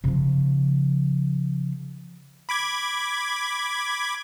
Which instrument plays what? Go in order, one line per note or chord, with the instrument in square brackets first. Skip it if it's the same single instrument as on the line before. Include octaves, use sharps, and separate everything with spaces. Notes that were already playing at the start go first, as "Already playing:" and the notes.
[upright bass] C#3 F3
[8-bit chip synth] B5 D6 G#6